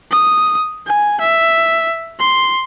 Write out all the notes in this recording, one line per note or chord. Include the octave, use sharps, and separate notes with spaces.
D#6
G#5
E5
C6